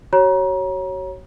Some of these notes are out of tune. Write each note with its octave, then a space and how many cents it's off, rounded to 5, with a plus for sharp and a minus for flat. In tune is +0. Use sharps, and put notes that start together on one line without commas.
F#4 +35 C#5 -10 A#5 +30